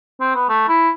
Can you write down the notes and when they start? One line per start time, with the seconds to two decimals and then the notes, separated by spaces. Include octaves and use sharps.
0.21 C4
0.35 B3
0.49 A3
0.69 E4